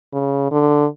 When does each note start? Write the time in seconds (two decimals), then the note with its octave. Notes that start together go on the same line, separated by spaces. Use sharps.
0.13 C#3
0.51 D3